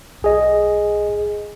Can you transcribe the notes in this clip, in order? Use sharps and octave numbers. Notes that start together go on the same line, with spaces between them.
B1 G#4 D#5